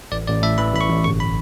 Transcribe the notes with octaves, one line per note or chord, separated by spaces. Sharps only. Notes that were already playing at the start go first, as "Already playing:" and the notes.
A1 D5
A1 D5
A2 E5
E3 B5
A1 B5
C#6
A1
G1 C#6
B5